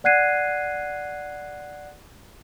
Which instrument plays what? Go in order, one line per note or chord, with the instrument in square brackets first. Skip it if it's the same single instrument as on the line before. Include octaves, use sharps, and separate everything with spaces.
[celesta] D5 F#5 F#6 G#6 C7 D#7